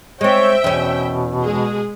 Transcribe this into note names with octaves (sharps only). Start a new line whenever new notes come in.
G#3 C4 C#5 E5 G5
E2 B2 C#4
G#3 G#4